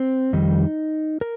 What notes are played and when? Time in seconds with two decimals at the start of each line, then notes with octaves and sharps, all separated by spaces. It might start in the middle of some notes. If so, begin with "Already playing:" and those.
Already playing: C4
0.33 F2 D#3 G3 D#4
1.21 A#4